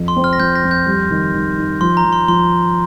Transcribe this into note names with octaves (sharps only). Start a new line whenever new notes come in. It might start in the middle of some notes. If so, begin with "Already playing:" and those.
Already playing: F2
C6
C4
F6
A#6
F2 G6
A#6
F2
G6
G3
D#3
D#3
D#4
F3 C6
A#5
F3
C6
F3 C6